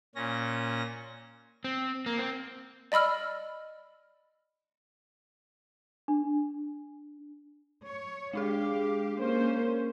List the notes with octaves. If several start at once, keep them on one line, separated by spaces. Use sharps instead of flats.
A#2 C#4 A#6
C4
A#3
C4
D5 D#5 B5 E6 F6
D4
C#5
G#3 D4 G4 G#4 F5
A#3 C#4 C5